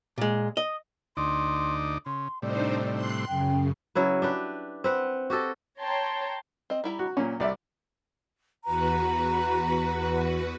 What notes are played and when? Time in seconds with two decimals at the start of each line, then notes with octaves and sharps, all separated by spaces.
0.18 A#2 G#3
0.57 D#5
1.17 D2 D#4 D5 C6
2.06 C#3 C6
2.42 A2 C3 G3 D4 D#4 C5 D5
2.94 C6 F#6 C7
3.28 F#2 C#3 G5
3.95 C#3 F#3 E4 B4
4.22 D4 G4 B4
4.84 C4 B4 F#5
5.30 F#4 G4 A4 D#5
5.79 C#5 G5 A5 A#5 C6
6.70 C4 D#5
6.84 G3 E4 A#5
6.99 F#4
7.17 A#2 F#3 C#4
7.40 C2 D5 E5
8.64 E2 F#4 B4 A#5